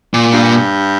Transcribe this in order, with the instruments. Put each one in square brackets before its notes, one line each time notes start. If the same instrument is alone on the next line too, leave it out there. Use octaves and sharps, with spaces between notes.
[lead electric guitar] A#2
[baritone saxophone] G2